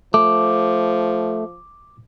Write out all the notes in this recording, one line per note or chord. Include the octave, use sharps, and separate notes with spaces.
F3 A3 D6